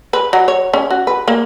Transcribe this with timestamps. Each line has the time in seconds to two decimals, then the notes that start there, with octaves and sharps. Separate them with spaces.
0.13 B4
0.33 F#3
0.48 C#5
0.73 C#4
0.90 F#4
1.07 B4
1.28 A#3